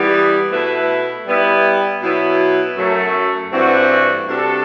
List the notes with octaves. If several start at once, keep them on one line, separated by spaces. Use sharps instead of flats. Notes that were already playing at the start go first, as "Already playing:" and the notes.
Already playing: E3 G3 B3
B2 A3 E4 B4
G3 B3 E4
B2 F#3 B3 E4
F#2 F#3 A3
G2 E3 A3 C4 F#4
C3 G3 D4 F#4 A4